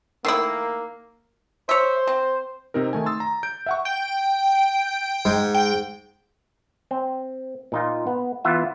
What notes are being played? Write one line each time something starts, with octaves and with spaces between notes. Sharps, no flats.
D#3 A3 A#3 E4 E6 C7
C5 C#5 E5
C4
C3 C4 D#4 A#4
D#3 A3 G#5
C6 D#6 E6 A6
A#5
G6 D7
E5 F#5 C#6
G5
G#2
G5
C4
A#2 D#4 F4
B3
E3 B3 F4 E5